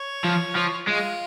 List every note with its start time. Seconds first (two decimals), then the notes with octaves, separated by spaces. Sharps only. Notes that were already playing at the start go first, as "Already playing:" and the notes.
Already playing: C#5
0.25 F3
0.56 F3
0.88 G#3 F4